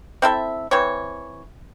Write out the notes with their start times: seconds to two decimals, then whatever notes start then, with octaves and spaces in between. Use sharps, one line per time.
0.22 C4 E4 A4 E5
0.71 E3 C4 C#5